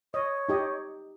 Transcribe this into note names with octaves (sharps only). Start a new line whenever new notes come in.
C#5 D#5
D#4 G4 D#5